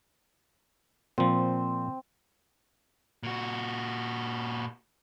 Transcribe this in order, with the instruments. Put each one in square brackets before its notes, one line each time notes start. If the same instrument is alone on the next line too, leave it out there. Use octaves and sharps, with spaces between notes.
[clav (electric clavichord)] A#2 F3 [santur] C4
[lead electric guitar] A#2 F#4